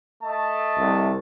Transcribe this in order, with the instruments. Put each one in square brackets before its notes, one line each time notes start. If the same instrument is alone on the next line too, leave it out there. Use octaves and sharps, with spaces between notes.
[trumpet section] A3 D#5 A5
[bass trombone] C2